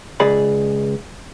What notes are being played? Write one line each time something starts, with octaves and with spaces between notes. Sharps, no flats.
C#2 G#4 D5 B5